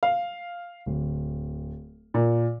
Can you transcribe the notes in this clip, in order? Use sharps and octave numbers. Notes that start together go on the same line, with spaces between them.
F5
D1
A#2